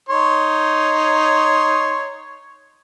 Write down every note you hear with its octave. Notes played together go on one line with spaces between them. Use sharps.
D#4 C#5 C6